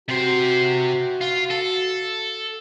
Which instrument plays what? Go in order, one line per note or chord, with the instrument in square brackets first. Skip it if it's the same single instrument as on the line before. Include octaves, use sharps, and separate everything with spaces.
[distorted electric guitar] C3 C5 [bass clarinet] F#4
[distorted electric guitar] F4
A4